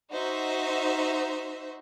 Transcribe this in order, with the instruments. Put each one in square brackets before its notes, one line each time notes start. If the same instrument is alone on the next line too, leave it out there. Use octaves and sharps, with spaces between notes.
[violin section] D#4 F#4 C5 E5